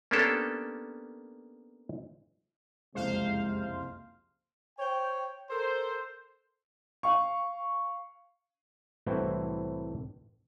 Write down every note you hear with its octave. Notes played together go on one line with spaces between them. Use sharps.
A#3 B3 C#4 D4 G4 A4
F#1 C2 F2 C3 G#3 C5 F5
C5 C#5 G5
A4 A#4 C5
F5 C#6
C2 A2 E3 C4 E4 F#4